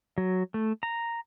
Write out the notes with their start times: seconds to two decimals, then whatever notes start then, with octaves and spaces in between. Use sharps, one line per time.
0.18 F#3
0.54 A3
0.83 A#5